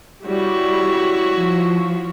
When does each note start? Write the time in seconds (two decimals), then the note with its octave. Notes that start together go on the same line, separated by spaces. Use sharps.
0.25 G3 E4 F#4 C#5
1.37 F3